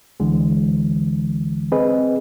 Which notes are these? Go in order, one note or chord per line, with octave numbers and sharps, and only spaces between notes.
D2 D3 E3 G#3
C4 G#4 B4 D#5